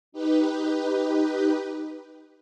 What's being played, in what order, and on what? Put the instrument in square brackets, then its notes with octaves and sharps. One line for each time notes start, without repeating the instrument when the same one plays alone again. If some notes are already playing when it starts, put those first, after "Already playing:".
[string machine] D#4 G4 B4